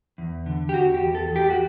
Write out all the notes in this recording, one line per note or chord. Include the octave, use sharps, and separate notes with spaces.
E2
D3
G4
E2 F#4
G4
E2
A4
E2
G4
F#4